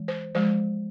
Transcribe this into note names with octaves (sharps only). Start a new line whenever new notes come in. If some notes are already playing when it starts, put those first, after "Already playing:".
Already playing: E3 G#3
C5
F3 G#3 C5